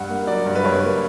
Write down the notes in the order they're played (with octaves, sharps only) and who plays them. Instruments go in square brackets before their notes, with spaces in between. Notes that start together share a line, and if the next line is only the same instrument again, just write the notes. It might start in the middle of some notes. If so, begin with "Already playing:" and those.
Already playing: [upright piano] G2 F#5
A#3
F#3 D5
G2
B4
G2 C#5
A#3